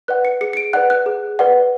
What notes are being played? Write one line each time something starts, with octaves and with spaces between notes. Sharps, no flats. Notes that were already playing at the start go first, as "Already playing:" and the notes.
B4 D5 F#5 F#6
C#7
G#4 C#7
C#7
D7
B4 D5 F#5 F#6
F#6
G#4
B4 D5 F#5